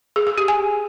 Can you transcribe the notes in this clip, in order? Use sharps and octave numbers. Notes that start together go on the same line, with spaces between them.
G#4
G#4
G4
G#5